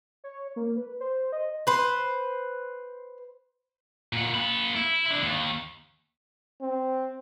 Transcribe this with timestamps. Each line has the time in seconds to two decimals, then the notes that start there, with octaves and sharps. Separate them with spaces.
0.24 C#5
0.56 A#3
0.77 B4
1.00 C5
1.32 D#5
1.67 B4 C5
4.13 A#2 F#5
4.35 A#3 B5
4.76 E4
5.06 D4 E4
5.22 D#2
6.62 C4